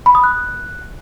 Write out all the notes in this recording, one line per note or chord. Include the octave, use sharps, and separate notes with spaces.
B5
D#6
F#6